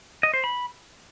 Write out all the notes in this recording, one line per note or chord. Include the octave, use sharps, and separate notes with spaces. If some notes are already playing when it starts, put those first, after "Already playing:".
D#5
C5
B5